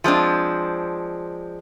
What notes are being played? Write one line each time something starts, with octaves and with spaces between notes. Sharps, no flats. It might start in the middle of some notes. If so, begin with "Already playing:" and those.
F3 G#3 C4 D4